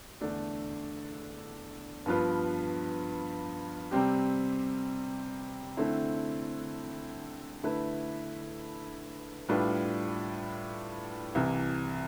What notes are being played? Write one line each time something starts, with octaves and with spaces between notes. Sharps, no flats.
E2 D3 A3 D4 A4
G2 F3 B3 F4 B4
C3 G3 C4 G4
D3 A3 C4 E4
D3 A3 E4 B4
A2 G3 D4 F4 B4
C2 C3 E3